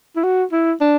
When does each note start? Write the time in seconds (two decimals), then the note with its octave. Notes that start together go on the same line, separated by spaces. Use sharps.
0.16 E4
0.23 F#4
0.52 E4
0.81 D4